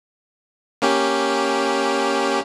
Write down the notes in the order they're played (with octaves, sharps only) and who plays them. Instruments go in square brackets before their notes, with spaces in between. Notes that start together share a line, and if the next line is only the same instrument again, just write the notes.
[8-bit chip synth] A#3 C#4 G4